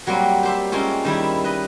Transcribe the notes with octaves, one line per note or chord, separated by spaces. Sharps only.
F#3 G3 A#3 C4
G4 C5 E5
G#3 A#3 C4 C#4 F4
D#3 G3 E4
B4 D#5